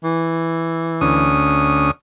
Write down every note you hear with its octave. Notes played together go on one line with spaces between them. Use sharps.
E3
D2 C#4 D#6